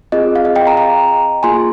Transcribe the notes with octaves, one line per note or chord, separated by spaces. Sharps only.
C4 F4 G#4 D#5
F5
D#5
D#5 G5
G5 A#5
G5 A#5
A#3 F4 G#4 G#5 C6